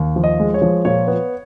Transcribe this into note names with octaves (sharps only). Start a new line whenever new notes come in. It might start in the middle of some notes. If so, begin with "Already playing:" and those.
Already playing: D#2
F3
D#5
G#3
C#5
F3
A#2 C#5
B3